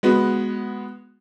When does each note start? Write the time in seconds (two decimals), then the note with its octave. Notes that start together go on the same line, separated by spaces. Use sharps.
0.03 G#3 B3 F#4